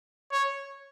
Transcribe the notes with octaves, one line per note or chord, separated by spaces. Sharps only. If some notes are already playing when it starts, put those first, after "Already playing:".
C#5